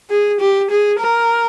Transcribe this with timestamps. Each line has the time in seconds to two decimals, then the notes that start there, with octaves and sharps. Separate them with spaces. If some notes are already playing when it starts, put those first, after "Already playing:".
0.10 G#4
0.40 G4
0.71 G#4
1.00 A#4